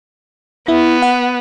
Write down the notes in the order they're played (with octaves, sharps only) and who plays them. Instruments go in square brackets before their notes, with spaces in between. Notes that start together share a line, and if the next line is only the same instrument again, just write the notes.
[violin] B3 [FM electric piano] E4
[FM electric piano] F#5